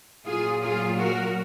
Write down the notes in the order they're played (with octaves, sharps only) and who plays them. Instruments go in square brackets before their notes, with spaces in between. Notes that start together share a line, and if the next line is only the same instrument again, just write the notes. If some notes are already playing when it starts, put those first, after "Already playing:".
[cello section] A#2 F#3 F4 G#4
F4 G#4
F#4 A#4